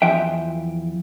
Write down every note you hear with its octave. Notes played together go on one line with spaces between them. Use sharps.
E2 F3 E5 G5